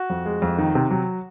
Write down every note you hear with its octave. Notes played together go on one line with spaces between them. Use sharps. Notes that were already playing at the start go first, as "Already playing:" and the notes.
Already playing: F#4
F2
G#3
F2
D#3
C3
F#3